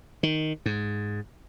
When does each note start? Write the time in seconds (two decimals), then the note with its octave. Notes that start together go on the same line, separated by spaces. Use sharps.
0.23 D#3
0.66 G#2